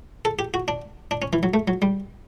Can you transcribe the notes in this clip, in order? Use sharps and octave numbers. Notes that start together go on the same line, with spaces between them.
A4
G4
F#4
D4
D4
C#4
E3
F#3
A3
F#3
G3